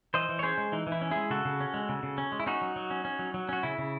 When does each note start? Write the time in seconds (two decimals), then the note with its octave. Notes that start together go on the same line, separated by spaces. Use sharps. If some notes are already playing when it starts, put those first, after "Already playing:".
0.14 E3 C5 D#5
0.29 E3
0.39 C#5
0.43 C#4 G#4 C5
0.58 G#3
0.72 E3 D#4
0.87 E3
0.92 E4
1.01 C#4
1.11 G#3 E4 G#4
1.30 C#3 F#4 A4
1.45 C#3
1.60 C#4
1.74 G#3
1.89 C#3
2.03 C#3
2.18 C#4
2.32 G#3
2.40 E4
2.46 C#4 D#4 F#4
2.61 F#3
2.76 F#3
2.90 C#4
3.05 C#4
3.19 F#3
3.34 F#3
3.49 C#4 F#4
3.63 C#3 E4
3.79 C#3